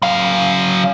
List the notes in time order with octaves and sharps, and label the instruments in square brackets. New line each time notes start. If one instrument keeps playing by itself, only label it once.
[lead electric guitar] F#3 F5